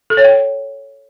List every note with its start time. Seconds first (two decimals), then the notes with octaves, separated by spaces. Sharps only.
0.10 A4
0.17 C#5
0.24 G5